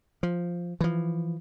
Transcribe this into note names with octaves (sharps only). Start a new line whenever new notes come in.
F3
E3 F3